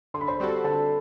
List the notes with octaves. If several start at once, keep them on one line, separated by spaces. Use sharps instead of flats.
D3 C6
B5
C5 C6
G3 C4 F#4 A4
D3 A4 A5